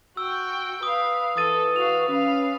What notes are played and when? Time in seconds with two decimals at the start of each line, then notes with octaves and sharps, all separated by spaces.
0.17 F#4 G5 E6
0.83 B4 F5 D#6
1.37 E3 A4 B4 D#6 A6 D#7
1.76 F#4 F5 F7
2.09 C#4 B4 F5